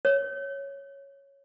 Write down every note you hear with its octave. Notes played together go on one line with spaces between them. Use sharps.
C#5